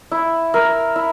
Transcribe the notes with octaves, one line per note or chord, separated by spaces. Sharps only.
E4
A#4 E5
E4